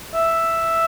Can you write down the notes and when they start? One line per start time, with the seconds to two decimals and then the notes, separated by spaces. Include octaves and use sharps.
0.14 E5